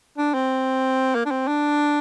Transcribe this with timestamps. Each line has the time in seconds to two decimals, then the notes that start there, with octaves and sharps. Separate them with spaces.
0.18 D4
0.34 C4
1.15 A#3
1.26 D4
1.31 C4
1.47 D4